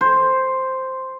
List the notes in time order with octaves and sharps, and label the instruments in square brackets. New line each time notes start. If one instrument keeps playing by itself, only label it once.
[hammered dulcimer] C5